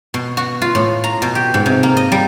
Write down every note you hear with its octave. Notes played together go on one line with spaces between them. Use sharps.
B2
F#4
F4
A2
A#5
B2
G4
G#2
C3
A#3
D#5
G3